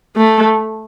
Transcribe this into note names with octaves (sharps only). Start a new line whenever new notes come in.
A3